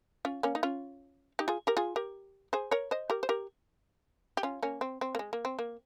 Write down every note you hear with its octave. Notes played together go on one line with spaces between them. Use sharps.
C#4 F4
A#3 C#4
D#4
C#4 F4
D#4 G4
F4 G#4
G4 A#4
F4 G#4
G4 A#4
G#4 C5
A#4 C#5
C5 D#5
G4 A#4
C5
G4 A#4
G4
C#4 F4
A#3 C#4
C4
C4
A#3
G#3
A#3
C4
A#3